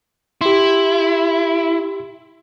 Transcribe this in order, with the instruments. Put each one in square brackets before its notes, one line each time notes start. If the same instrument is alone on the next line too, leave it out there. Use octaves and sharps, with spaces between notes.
[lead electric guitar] E4 [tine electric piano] G4 C6